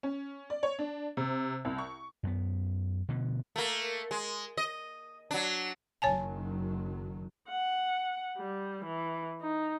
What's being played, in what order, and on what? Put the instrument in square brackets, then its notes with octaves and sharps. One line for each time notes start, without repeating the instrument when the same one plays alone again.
[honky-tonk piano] C#4
D5
C#5
D4
C3
C2
C#6
[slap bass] F#2 B3
B2 D3 F3
[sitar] A3 A#3
G#3
D#5
F#3 D4
[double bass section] F#1 D#3 F#3 [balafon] C#5 G#5 A5
[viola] F#5
G3
E3
D#4